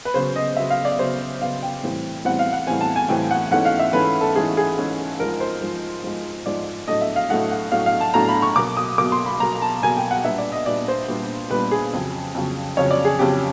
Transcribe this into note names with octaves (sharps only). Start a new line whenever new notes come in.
B4
C#3 F#3 B3 C5
D#5
C#3 F#3 B3 E5
F5
D5
C#3 F#3 B3 C5
C#3 F#3 B3 F5
G5
A2 E3 G3 C4
A2 E3 G3 C4 F#5
F5
F#5
A2 E3 G3 C4 G#5
A5
G#5
A2 E3 G3 C4 G5
F#5
G#2 E3 A3 C#4 F#5
F5
E5
G#2 E3 A3 C#4 B4
A4
G#2 E3 A3 C#4 G#4
G#4
G#2 E3 A3 C#4
G#2 F3 G#3 A#4
C5
G#2 F3 G#3
G#2 F3 G#3
G#2 F3 G#3 D5
A2 F#3 A3 D4 D#5
E5
F5
A2 F#3 A3 D4 F#5
F#5
A2 F#3 A3 D4 F5
F5
A5
A2 F#3 A3 D4 A#5
B5
C#6
B2 F#3 A#3 D6
D#6
B2 F#3 A#3 D6
C6
B5
B2 F#3 A#3 A#5
A5
B2 F#3 A#3 G#5
G5
F#5
A#2 G3 B3 D4 E5
D5
D#5
A#2 G3 B3 D4 D5
C5
A#2 G3 B3 D4
A#2 G3 B3 D4 B4
G#4
F2 C#3 F#3
F2 C#3 F#3
F2 C#3 F#3 C#5
D5
G#4
F2 C#3 F#3 G4